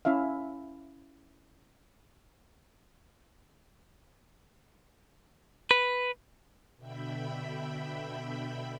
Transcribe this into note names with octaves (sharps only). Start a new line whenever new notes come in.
C#4 E4 E5 F5
B4
B2 D3 E5 G5 B5